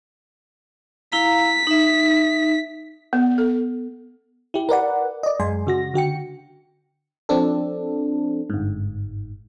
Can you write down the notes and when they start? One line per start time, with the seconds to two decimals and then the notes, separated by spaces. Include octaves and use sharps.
1.12 E4 F5 A#5 B6
1.67 D#4 E5
3.13 B3
3.38 A4
4.54 E4 G4
4.69 A#4 B4 D5 F#5
5.23 D5 D#5
5.40 F#2 G#3 G#5 C6
5.67 C#3 F#4 A#6
5.94 D3 F#4 G5 C#7
7.29 F3 C4 D4 A4
8.50 G1 G#2